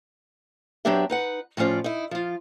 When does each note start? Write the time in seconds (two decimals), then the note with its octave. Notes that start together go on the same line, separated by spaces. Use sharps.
0.85 F#3 B3 C4 D4 G4 E5
1.10 D#4 B4 F#5
1.57 A2 F3 C#4 F4 D5
1.84 D#4 E4
2.11 F3 F4